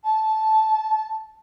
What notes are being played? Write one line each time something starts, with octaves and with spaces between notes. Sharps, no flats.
A5